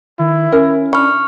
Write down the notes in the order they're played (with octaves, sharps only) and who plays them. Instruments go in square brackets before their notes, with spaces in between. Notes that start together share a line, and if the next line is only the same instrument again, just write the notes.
[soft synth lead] D#3 [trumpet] E4
[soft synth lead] C#4 [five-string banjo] A#4
[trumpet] D4 [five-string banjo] B5 [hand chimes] C#6 F6